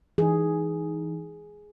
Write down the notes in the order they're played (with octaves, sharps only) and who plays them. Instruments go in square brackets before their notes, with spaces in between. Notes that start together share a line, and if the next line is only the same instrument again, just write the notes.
[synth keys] E3 D#4 [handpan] G#4